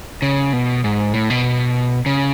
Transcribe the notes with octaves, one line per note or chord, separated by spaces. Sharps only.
C#3
B2
G#2
A2
B2
C#3